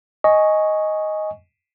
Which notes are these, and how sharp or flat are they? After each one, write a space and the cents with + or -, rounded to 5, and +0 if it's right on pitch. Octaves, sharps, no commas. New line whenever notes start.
D#5 +5 G#5 +0 C#6 +0